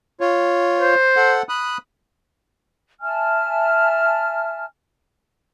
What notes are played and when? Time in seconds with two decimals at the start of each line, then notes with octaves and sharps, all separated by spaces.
0.21 F4 C#5
0.79 C5
1.16 A4 F#5
1.49 B5 D#6 F#6
3.01 E5 G#5 A5 F6